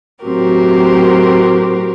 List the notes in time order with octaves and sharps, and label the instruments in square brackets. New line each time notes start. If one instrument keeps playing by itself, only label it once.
[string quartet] A2 F#3 C4 F#4 G4 A#4